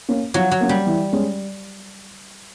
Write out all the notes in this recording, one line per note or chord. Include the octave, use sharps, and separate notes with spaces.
A#3 C#4
F3 F#3
F#3
A#3 C#4
G3
E3
G#3 C#4